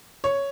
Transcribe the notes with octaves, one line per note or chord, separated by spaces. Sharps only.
C#5